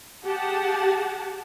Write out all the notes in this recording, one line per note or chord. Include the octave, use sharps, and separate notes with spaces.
G4 G#4 F#5 A5